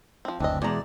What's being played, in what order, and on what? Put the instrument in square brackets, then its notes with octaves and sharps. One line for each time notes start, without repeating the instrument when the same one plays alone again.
[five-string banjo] F3 C4
[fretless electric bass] F#1 D2 [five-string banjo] E3 D#5 [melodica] C4 D4
[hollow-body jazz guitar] E2 A#5 [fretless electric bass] B2 G#3 [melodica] D5